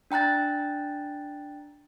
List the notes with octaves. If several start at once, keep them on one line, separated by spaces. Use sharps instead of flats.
D4 G5 A#5 F#6 A6